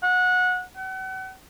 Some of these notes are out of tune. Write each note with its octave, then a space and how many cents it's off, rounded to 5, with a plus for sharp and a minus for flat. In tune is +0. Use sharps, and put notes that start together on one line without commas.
F#5 -20
F#5 +40